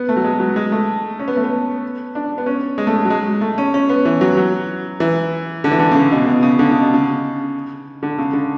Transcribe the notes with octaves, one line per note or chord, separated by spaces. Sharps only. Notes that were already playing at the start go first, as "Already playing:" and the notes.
Already playing: B3
A3
F#3
G#3
F#3
G#3
A3
C#4
B3
A3
B3
D4
B3
C#4
G#3
A3
G#3
F#3
G#3
A3
C#4
C#4
B3
E3
F#3
F#3
E3
D3
E3
D3
C#3
D3
B2
B2
C#3
D3
C#3
B2
C#3
D3
C#3
D3